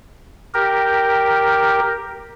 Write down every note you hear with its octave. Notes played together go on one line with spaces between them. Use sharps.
G4 A#4